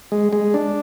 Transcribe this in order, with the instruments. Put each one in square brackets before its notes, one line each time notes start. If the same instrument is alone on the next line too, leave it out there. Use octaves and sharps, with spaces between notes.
[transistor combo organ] G#3
G#3
D4